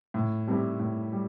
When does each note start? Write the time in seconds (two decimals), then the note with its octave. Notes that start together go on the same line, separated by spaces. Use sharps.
0.14 A2
0.47 G3 C4 E4 G4
0.80 A2
1.13 G3